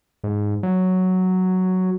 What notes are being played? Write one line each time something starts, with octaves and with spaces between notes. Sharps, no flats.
G#2
F#3